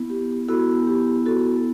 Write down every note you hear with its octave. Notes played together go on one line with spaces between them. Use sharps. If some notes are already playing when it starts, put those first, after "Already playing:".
Already playing: B3 E4
G4
B3 E4 F#4 A4
G4
F#4 A4